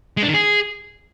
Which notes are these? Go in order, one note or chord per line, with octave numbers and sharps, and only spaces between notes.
G#3
D4
D#3
G#4